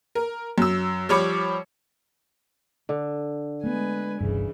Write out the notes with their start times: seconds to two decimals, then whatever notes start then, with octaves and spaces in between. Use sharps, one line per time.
0.15 A#4
0.58 F#2 E6
1.09 F3 G3 C#5 B5 D6 C#7
2.89 D3
3.64 G#3 A3 B3 B4 G#5
4.20 G1 C2 G2 C#3 E3